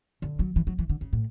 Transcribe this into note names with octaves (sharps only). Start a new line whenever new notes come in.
D3
F#3
E3
F#3
E3
D3
C#3
A2